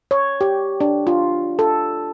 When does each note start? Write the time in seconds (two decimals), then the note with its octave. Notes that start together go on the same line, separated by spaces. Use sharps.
0.11 C#5
0.41 G4
0.81 D4
1.07 F4
1.59 A4